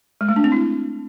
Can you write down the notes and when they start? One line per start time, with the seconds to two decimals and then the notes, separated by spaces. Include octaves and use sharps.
0.21 G#3
0.29 A3
0.36 D4
0.44 C4
0.52 E4